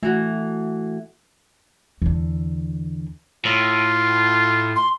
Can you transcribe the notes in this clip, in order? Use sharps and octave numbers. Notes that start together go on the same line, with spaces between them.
E3 A3 F#4
E2 D3
A2 F4
C6